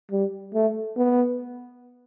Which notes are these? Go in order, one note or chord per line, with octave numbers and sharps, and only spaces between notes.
G3
A3
B3